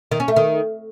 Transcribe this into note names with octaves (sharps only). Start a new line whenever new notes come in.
D#3
C#4
A3
D#3